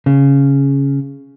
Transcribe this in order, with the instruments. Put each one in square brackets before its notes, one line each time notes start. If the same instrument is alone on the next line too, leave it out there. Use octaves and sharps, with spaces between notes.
[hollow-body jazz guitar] C#3